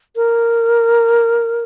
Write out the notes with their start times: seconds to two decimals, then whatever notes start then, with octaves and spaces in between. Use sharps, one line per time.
0.16 A#4